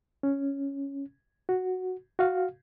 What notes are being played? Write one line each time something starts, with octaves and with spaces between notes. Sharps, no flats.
C#4
F#4
F#4 F5